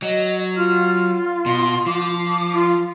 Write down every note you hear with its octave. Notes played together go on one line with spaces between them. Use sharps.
F#3 D#5
F4 F6
B2 C6
F3 D6
F4